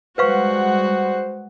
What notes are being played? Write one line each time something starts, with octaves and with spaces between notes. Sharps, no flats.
G3 G#3 F#4 B4 C5 F5 F#5 C#6